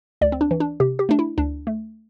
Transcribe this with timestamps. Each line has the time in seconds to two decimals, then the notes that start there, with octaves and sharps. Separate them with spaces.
0.21 D2 D5
0.32 C4
0.41 D4
0.51 E3
0.60 D4
0.80 C3 G4
0.99 G4
1.09 A3 D4
1.19 E4
1.38 D2 D4
1.67 A3